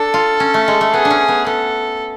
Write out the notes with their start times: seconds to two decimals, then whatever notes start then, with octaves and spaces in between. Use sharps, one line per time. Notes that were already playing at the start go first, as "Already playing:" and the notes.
Already playing: D4 A4
0.14 F4
0.40 C#4
0.54 A3
0.68 G#3
0.81 A3
0.93 B3 G#4
1.05 D4
1.11 C#4
1.28 B3
1.46 B3 A4